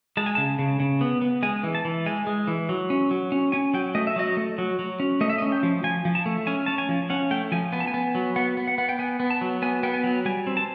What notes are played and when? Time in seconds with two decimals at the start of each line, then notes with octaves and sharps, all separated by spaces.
0.17 G#3 A5
0.26 G#5
0.35 C#3 A5
0.59 C#3
0.80 C#3
1.01 B3
1.22 B3
1.43 G#3 G#5
1.63 E3
1.75 A5
1.85 E3
2.06 G#3 G#5
2.27 G#3
2.47 E3
2.69 F#3
2.90 C#4
3.11 F#3
3.32 C#4
3.52 C#4 G#5
3.74 F#3 G5
3.95 A3 D#5
4.07 E5
4.16 F#3 D#5
4.37 A3
4.58 F#3
4.79 F#3
5.00 C#4
5.21 A3 D#5
5.30 E5
5.38 D#5
5.42 C#4
5.52 G5
5.63 F3
5.84 F3 G#5
6.05 F3
6.15 A5
6.26 A3
6.47 C#4 G#5
6.66 C#4 A5
6.78 G#5
6.89 F3
7.10 C#4 F#5
7.31 A3 G5
7.52 F3 G#5
7.72 B3 G#5
7.80 A5
7.87 G#5
7.94 B3
8.15 F#3
8.36 B3 F#5
8.57 B3
8.68 F#5
8.78 B3 F#5
8.89 G5
8.99 B3 G#5
9.20 B3
9.30 A5
9.41 F#3
9.62 B3 G#5
9.83 B3 G5
9.94 G#5
10.04 F#3
10.25 G3 G#5
10.47 C4
10.57 A5